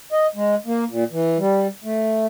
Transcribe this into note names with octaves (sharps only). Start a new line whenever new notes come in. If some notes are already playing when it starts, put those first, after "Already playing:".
D#5
G#3
A#3
A#2
E3
G3
A3